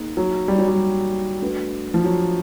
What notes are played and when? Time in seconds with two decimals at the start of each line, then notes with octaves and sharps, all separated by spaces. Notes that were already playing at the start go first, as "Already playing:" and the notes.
Already playing: A#3 D#4 G#4
0.17 F#3
0.48 G3
0.58 F#3
0.68 G3
1.42 A3 D4 F#4 B4
1.94 F3
2.04 F#3